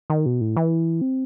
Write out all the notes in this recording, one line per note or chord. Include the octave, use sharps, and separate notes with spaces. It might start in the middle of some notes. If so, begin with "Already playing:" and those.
D#3
B2
A2
E3
C4